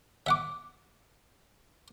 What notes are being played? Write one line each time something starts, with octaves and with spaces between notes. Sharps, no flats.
E5 F#5 D6